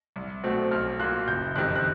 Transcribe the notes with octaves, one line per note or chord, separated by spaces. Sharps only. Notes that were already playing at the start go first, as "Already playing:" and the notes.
C2
B2 F#3 A3 C4
B1 F6
A#2 F#3 A#3 F#6
F#1 G6
F2 C3 D#3 F#6
F#6